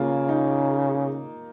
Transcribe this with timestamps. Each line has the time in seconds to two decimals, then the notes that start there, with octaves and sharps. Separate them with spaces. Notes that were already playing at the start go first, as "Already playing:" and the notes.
Already playing: C#3 A#3 F4
0.29 D#4